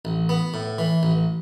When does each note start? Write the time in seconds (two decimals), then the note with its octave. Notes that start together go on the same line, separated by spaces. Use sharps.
0.05 A1
0.29 B3
0.54 A2
0.78 E3
1.03 A1